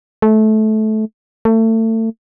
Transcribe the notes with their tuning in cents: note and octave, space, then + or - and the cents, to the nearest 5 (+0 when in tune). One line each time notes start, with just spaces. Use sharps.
A3 -20
A3 +30